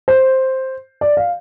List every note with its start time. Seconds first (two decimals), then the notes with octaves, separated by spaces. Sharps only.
0.08 C5
1.01 D5
1.17 F5